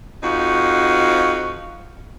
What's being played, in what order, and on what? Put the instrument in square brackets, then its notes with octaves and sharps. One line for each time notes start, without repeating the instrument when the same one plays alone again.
[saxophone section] F2 F3 D#4 F#4